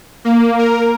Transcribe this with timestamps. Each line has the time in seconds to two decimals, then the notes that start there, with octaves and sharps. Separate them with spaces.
0.25 A#3
0.58 A#4